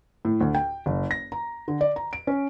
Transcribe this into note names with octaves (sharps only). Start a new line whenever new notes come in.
A2
D2
G5
F#1
A#6
A#5
D3
D5
A#5
D7
C#4